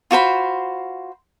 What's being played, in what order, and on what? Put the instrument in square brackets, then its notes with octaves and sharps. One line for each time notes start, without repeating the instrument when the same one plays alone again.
[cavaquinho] F4 F#4 C5 B5